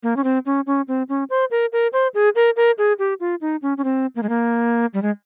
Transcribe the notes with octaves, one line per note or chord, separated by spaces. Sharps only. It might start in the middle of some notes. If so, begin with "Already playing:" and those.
A#3
C#4
C4
C#4
C#4
C4
C#4
C5
A#4
A#4
C5
G#4
A#4
A#4
G#4
G4
F4
D#4
C#4
C#4
C4
A#3
G#3
A#3
G3
G#3